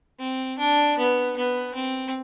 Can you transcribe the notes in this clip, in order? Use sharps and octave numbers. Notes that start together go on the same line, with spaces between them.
C4
D4
B3
B3
C4